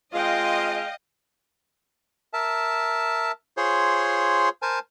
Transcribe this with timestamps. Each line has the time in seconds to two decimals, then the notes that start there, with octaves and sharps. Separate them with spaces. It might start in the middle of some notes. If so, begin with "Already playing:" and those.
0.13 G#3 C4 F4 D#5 F5 G5
2.33 A#4 E5 A5
3.57 F4 G#4 C5 C#5 C6
4.62 A#4 C5 G#5 A5